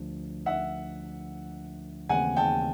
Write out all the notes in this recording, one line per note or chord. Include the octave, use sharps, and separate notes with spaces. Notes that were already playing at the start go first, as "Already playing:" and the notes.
Already playing: D2 D3 F3 A3 D4
E5 F#5
D#2 C#3 E3 A3 C4 F#5 G#5
G5 A5